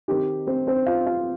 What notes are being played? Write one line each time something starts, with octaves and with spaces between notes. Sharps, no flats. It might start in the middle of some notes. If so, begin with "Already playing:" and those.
D#3 C4 D#4 G4
C4 C5
C4 C5
F4 F5
F4 F5